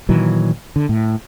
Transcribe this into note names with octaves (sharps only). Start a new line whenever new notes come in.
A#2 D#3 E3 F#3
D3
A2